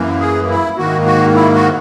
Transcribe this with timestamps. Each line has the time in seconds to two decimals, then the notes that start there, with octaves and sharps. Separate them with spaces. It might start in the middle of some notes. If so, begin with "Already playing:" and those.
Already playing: F#2 E3 A#3
0.20 G#4
0.49 E4
0.78 G#2 D#3 A#3 F#4
1.06 F#4
1.34 E4
1.55 F#4